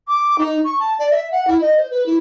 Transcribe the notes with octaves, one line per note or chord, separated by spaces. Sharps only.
D6
D#4
C#6
A5
D5
E5
F#5
E4
D#5
C5
B4
E4